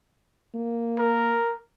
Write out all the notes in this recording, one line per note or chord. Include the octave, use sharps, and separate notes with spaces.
A#3
A#4